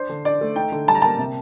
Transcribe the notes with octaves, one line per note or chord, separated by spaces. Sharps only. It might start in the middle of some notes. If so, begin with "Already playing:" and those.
Already playing: D4 C5
D3
D4 D5
A3
D#4 G5
D3
G3 A5
A#5
A#3 A5
C3